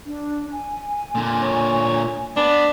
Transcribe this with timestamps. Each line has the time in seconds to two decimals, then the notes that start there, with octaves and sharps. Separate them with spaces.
0.06 D4
0.52 G#5
1.15 A#2 D3
1.42 C#5
2.37 B3 D4